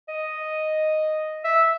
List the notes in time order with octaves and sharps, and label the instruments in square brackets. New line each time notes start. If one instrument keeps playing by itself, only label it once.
[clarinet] D#5
E5